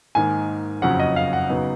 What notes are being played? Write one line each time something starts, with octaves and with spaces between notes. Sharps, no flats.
G#2 D#3 A#3 G#5
F#1 F2 C#3 F#3 C#4 F#5
D#5
F5
F#5
C#3 F#3 B3 D#4